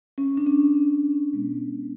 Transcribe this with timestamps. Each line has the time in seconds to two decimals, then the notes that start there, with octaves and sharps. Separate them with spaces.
0.18 C#4
0.37 D4
0.46 C#4
1.32 B2 G#3 B3